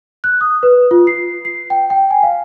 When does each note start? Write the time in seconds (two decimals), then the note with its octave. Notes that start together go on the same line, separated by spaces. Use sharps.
0.24 F#6
0.41 D#6
0.63 B4
0.91 F4
1.07 C7
1.45 C7
1.70 G5
1.90 G5
2.11 G#5
2.23 F5